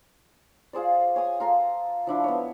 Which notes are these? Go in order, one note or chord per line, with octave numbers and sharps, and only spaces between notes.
F4 G#4 C5 D5
C#5 G#5 D#6
F4 A4 A#5 C6
F3 D4 E4
B3 C#5